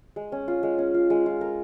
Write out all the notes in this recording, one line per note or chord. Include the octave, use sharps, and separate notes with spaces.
G#3
C#4
F4
G#3
C#4
F4
G#3
F4
A#4